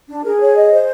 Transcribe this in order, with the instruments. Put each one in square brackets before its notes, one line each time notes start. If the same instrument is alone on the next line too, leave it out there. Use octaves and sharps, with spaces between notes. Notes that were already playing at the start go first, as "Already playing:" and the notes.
[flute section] D4
[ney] G#4 [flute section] A#4
[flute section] C#5
D#5
C5